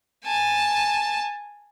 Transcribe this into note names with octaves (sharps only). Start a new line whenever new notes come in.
G#5 A5